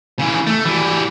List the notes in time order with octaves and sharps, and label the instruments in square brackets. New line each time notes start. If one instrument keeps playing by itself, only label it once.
[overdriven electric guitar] C#3 E3
A3
E3 G3